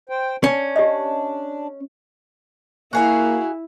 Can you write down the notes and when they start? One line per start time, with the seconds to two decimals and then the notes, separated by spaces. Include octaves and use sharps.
0.09 C5 G5
0.44 C#4 D4
0.76 G4 D5 D#5
2.93 A#3 E4 F#4 G#4 F5